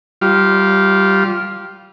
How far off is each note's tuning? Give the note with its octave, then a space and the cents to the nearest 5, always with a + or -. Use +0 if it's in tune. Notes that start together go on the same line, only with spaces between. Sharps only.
G3 -15 F4 +0